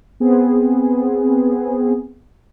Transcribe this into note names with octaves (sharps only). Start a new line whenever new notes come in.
B3 C4 G#4